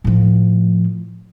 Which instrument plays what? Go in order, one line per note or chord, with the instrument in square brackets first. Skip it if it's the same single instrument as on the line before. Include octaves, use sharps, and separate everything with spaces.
[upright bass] A2 F3